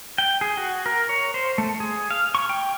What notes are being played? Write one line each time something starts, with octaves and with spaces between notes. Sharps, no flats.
G5
G#4
F#4
A#4
C#5
C5
A3
G#4
F5
C#6
G5